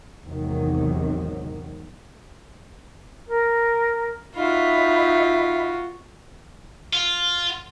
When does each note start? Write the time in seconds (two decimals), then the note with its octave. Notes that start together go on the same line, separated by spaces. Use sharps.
0.23 G#1 E2 G#2 C3 D#3 F#3
3.27 A#4
4.35 D#4 F4 F#4 E5 B5
6.93 F4